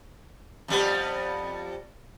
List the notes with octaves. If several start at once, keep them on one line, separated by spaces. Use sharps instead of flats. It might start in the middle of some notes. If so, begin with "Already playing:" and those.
F2 G3 B3